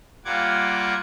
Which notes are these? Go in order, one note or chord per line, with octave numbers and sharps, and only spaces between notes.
G3 A#3 F4 F#5 D6 G#6